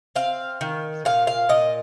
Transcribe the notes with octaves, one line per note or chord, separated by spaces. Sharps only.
C4 F5
D#3
A#2 F5
F5
A#2 D#5